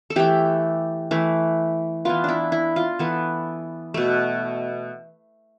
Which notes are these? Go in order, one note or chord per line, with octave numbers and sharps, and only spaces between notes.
A4
E3 A3 G4
E3 A3
E3 B3 F4
D4 E4
E4
F4
E3 B3 A4
B2 A3